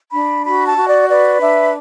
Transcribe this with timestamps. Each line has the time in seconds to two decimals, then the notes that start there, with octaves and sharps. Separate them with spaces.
0.12 D4 B5
0.45 F#4 B5
0.67 A5
0.77 F#4
0.88 D5
1.09 B4 D5
1.42 D4 E5